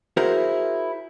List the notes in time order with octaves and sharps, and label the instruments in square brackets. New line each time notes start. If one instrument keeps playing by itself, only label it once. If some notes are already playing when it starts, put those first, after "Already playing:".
[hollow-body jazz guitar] E4 F#4 G#4 A#4 C5